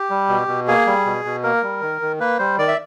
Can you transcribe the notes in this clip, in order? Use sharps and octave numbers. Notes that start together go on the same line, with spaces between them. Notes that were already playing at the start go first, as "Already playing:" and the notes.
Already playing: G4
G3
B2
B2
A#3 G#4
G3
B2
B2
A#3 A#4
G3
D#3
D#3
A#3 B4
G3 C5
D#3 D5
E5